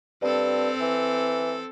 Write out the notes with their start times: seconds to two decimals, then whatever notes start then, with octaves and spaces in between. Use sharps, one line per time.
0.22 G2 C4 A4
0.81 E3